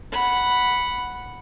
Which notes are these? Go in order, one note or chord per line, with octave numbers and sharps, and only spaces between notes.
F#5 B5